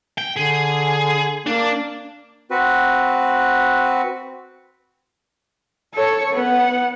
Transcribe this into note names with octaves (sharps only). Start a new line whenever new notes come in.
G5
D3 G#4
A#3 D4
C4 F#4 B4
A4 C#5
B3 F#5